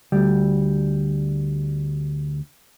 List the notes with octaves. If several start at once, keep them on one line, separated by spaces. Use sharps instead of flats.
D2 G3